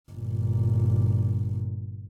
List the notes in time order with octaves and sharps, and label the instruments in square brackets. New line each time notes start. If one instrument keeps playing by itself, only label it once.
[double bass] G1 A#2